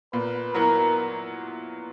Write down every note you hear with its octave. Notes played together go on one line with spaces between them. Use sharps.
A#2 B4
F#3 B3 E4 A#4